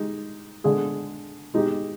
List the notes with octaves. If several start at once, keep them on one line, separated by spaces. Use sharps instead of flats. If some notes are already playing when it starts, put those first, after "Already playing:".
Already playing: G#3 D#4 G4
D3 G#3 D4 G#4
G#3 D#4 G4